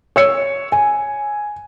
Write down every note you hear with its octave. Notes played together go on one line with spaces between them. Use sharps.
C#5 E6 C#7
G#5